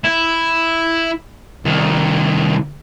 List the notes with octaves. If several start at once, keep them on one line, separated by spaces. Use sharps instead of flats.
E4
C2 D#3